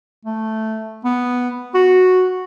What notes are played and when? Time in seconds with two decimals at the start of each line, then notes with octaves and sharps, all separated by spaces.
0.25 A3
1.05 B3
1.74 F#4